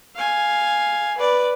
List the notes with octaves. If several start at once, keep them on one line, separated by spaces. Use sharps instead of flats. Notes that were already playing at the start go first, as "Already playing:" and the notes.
F5 G#5
B4 D5